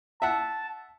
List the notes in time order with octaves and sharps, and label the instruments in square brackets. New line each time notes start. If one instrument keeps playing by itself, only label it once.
[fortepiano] E5 F#5 [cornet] A5